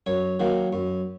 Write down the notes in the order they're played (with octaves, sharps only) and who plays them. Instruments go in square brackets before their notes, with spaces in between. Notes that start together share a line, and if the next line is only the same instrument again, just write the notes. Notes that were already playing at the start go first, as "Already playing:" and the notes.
[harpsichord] F#2 C#5
D#3 F#3 A#3
F#2